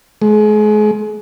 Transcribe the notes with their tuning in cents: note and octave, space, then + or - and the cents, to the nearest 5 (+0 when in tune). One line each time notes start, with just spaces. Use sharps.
G#3 +35